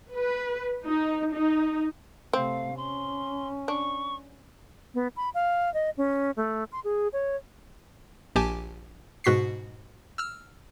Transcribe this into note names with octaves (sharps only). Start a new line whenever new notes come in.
B4
D#4
D#4
C3 A3 C4 F5
C#4 C6
D4 C#6
B3
B5
F5
D#5
C#4
A3
C6
G#4
C#5
A#1 G4 G#5 A5 D6
G#2 B2 F#4 C#6 B6 C7
E6 F6